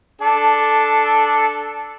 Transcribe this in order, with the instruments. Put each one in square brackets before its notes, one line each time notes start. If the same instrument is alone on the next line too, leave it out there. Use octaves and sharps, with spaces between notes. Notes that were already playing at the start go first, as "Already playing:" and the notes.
[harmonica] D4 A4